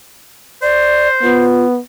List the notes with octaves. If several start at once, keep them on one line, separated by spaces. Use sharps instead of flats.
C5 D5
B3 F4